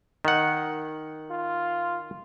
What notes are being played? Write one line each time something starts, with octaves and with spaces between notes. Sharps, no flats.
D#3 F#5
F4